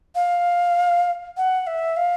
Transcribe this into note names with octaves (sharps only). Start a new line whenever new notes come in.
F5
F#5
E5
F5